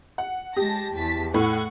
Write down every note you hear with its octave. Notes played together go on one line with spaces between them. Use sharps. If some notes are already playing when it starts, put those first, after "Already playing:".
F#5
G#3 G4 A5 A#6
E2 A5 B6
A2 F#5 C#6